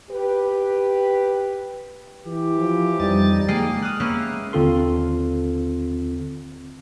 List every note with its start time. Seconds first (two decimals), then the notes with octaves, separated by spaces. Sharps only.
0.10 G4 B4
2.26 E3 G4
2.58 F3
3.00 F2 G3 D#4 A6
3.48 G#3 A#3 D#5 G5 C7
3.82 D#6 F6 F#6
4.00 A#3 B3 C#4 D#5 E5
4.53 D#2 D3 C4 F4 A4 C6